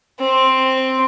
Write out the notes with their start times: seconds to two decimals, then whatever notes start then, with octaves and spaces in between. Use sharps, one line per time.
0.20 C4